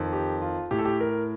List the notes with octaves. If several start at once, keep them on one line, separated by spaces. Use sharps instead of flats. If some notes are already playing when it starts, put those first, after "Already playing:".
Already playing: F2 D#3
G4
F4
A2 G4
A4
G4
A#4